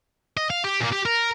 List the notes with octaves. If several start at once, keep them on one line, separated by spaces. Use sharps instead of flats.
D#5
F5
G4
A#2 A#3
G4
A#4